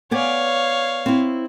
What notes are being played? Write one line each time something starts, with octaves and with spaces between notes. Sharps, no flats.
B3 C#5 D5 F5 G#5
C4 E4